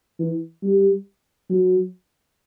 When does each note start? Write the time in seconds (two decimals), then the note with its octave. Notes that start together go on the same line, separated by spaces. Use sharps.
0.19 E3
0.63 G3
1.50 F#3